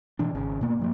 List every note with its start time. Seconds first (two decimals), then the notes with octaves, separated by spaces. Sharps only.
0.19 B2 E3 D4
0.35 G#1 C#3
0.61 B2 A#3 B3
0.79 G2 F3 A#3